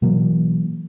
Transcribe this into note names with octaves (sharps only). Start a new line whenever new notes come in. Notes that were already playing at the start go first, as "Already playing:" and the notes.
B2 E3 F#3 A#3